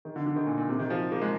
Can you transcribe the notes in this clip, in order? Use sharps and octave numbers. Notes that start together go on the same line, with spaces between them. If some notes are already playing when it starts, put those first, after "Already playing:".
D#3
D3
D3
D#3
A#2
A#2
C3
D#3
F3
A#3
G#3